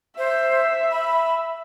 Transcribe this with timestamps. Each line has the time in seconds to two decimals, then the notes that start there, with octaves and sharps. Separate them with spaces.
0.18 C5 E5
0.91 B5